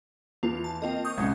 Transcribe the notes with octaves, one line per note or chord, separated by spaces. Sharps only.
E2 E3 F4
A5
A#3 C4 F4 D#5
C#6 D#6 G6
C2 G#3 C#4